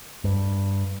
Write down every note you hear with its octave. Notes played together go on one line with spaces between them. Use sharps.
G2